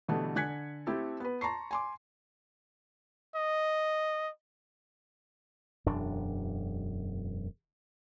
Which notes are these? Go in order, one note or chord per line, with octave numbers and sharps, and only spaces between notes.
B2 D3 E3 G3 A3 B3
D3 G#5 F#6 G#6 B6 C#7
A3 C4 E4 G4 A4
B3 B4
A5 A#5 C6 C#6 C7
G#5 C6 D6
D#5
E1 F#2 D4